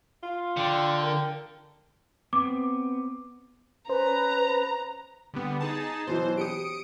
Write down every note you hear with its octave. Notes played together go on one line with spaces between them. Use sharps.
F4
D3 D4 D5 G5
A#4 G5
B3 C4 D6
C#4 B4 C5 A#5
D3 G3 B3
D#4 G#4 A5
B2 E3 F#3 C5
G4 D#6 C#7 D7